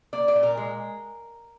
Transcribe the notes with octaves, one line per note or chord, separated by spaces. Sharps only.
A#3 D5
D5
A#2
A#4
G#3